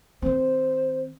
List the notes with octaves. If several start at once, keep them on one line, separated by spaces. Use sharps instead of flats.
D#3 C4 C5